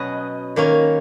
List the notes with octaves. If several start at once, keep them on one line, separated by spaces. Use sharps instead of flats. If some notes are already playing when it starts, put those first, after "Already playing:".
Already playing: B2 F#3 C#4 B4 D#5
D#3 A#3 C#4